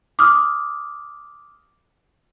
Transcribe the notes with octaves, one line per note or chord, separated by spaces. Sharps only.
D6 D#6 F6